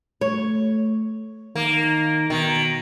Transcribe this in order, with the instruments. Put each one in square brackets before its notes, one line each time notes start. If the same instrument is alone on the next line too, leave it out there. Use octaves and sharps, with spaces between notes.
[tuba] A3 [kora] C#5
[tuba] D#3 [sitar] A#3
[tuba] B2 [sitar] D#3